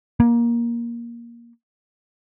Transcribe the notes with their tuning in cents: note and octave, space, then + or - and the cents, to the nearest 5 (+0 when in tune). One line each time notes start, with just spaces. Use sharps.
A#3 +15